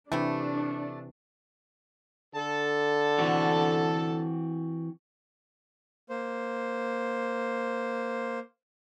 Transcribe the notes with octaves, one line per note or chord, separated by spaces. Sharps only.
C3 E3 A3 D4 E4 G4
D3 A4 A5
E3 C4 F#4
A#3 C5